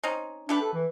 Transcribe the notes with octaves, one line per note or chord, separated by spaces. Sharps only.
C4 C#4 D#4
A3 D4 G4 B4
A4
E3